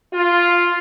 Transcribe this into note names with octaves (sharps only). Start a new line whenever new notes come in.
F4